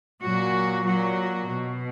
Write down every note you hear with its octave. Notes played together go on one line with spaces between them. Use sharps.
A#2 F#3 F#4
F#3 F#4
B2